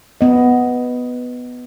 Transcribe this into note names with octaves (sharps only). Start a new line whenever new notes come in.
B3 D#5